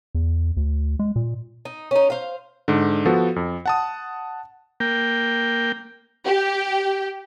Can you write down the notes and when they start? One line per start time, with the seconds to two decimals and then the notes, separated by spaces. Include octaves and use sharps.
0.15 E2
0.57 D2
0.99 G#3
1.16 A#2
1.65 D#4
1.91 C#4 D#4
2.10 C5 F5
2.68 G#2 D3
3.06 F3 B3 F#4 A4
3.36 F2
3.66 F#5 A5 D#6
4.80 A#3 G5
6.26 G4